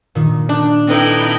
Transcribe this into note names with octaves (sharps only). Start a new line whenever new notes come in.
A#2 D#3
D4
C4 D#4 E4 A4 B4 G5